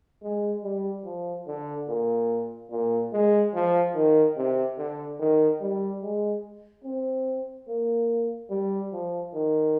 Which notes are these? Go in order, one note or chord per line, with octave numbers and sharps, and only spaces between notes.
G#3
G3
F3
D3
A#2
A#2
G#3
F3
D#3
C3
D3
D#3
G3
G#3
C4
A#3
G3
F3
D#3